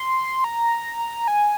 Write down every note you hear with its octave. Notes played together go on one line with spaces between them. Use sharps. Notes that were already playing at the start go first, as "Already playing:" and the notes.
Already playing: C6
A#5
G#5